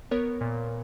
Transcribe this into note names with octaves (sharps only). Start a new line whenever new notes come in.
B3 A#4 C#5
A#2